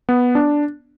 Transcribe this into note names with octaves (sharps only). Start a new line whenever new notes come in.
B3
D4